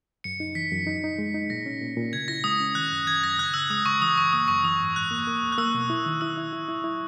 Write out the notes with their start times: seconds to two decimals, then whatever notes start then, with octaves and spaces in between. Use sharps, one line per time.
0.24 F#2 C#7
0.40 D#4
0.55 E3 B6
0.72 F#2
0.87 D#4
1.04 D#4
1.18 G#3
1.34 D#4
1.50 A#2 A#6
1.66 C#4
1.81 A#2
1.97 A#2
2.13 C#3 G#6
2.28 E4 A#6
2.44 G#3 D#6
2.61 C#4
2.75 D#3 F#6
2.92 F#2
3.07 D#3 G#6
3.23 F#2 A#6
3.39 C#3 F#6
3.54 C#3 E6
3.70 G#3 D#6
3.85 C#3 C#6
4.02 E3 D#6
4.17 F#2 C#6
4.33 A#3 D#6
4.48 F#2 C#6
4.64 E3 D#6
4.80 G#2
4.96 G#2 F#6
5.11 A#3
5.27 A#3
5.43 E2
5.52 F#6
5.58 A#3 E6
5.74 B2
5.90 E4
6.06 D#3
6.21 E4 E6
6.37 E4
6.53 E4
6.68 E4
6.84 E4